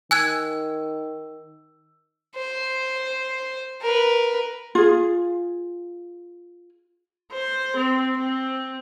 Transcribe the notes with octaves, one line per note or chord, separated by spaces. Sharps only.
D#3 G#5 E6 F#6 G#6 D#7
C5
A#4 B4
F4 G#4
C5
C4
C4